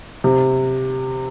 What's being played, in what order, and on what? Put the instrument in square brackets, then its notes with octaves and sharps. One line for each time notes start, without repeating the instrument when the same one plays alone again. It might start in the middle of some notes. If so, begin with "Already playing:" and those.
[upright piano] C3